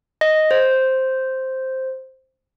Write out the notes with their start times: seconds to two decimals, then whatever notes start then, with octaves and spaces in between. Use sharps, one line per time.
0.21 D#5
0.51 C5